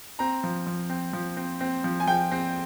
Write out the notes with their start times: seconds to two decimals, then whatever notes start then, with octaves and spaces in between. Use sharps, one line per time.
0.19 C4 A#5
0.44 F3
0.67 F3
0.90 C4
1.13 F3
1.37 C4
1.61 C4
1.84 F3
2.00 G#5
2.07 F3 G5
2.32 C4